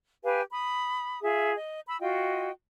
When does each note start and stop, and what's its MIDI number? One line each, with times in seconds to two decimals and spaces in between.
0.24 0.41 67
0.24 0.41 71
0.24 0.41 77
0.24 0.41 80
0.51 1.21 83
0.51 1.21 87
1.21 1.54 65
1.21 1.54 68
1.21 1.54 76
1.57 1.79 75
1.87 1.99 83
1.87 1.99 88
2.01 2.50 65
2.01 2.50 66
2.01 2.50 75
2.01 2.50 79